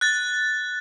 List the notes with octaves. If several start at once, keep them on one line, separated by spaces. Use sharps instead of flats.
F#6 A6